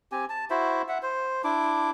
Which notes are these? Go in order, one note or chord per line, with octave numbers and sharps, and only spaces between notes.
C4 G4 G#5
A5
E4 F#4 C5 E5
E5 F#5
C5
D4 E4 D6